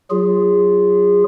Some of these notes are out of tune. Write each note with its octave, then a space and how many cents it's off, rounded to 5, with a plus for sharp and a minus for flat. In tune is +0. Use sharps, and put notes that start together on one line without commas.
F#3 +0 F4 +0 G#4 -25